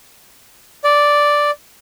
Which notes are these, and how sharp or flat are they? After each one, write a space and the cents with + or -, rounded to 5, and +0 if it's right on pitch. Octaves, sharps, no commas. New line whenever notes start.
D5 -5